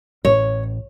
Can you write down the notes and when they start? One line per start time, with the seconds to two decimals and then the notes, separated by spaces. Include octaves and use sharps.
0.25 A1 C#5